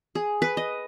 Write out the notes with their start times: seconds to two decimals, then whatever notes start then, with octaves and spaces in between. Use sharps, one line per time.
0.15 G#4
0.42 B4
0.57 D#5